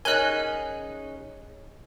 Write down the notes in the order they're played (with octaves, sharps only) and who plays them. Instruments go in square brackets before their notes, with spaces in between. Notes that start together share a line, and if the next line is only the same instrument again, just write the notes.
[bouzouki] C#4 D#4 G#4 [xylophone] A#4 D#5 [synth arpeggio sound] G#5 F#6